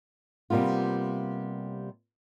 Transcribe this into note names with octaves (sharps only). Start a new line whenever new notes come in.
C3 G3 A#3 B3 F4